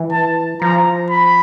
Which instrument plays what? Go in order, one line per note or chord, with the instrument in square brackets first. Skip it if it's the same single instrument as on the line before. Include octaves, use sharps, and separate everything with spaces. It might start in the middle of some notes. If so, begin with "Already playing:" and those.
Already playing: [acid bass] E3
[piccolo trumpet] A5
[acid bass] F3 [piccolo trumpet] A#5
[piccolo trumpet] B5